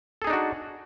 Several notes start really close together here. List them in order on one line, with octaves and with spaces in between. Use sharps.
A4 G#4 D#4 D4 F#4